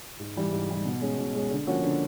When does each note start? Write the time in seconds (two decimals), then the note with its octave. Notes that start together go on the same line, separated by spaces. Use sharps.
0.19 G#2
0.36 E3 G3
0.52 G#2
0.69 E3 G3
0.85 B2
1.01 G#3 C#4
1.18 B2
1.35 G#3 C#4
1.50 D3
1.67 F3 A#3 C#4 F#4
1.83 D3